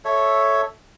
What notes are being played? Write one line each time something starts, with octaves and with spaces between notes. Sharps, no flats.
A4 C#5 E5